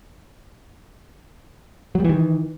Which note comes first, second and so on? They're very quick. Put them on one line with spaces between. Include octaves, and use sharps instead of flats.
F#3 G3 E3 D#3